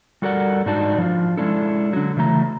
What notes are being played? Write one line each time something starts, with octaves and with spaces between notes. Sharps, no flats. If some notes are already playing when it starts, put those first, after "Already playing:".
G3 F#4 A4 A#4 D5 F#5
G#2 D4 D#4 F#4 D5 A5
F3 D4 F4
G#3 C#4 D4 E4 A4
D3 F#3
C#3 E3 F#3 A3 A#5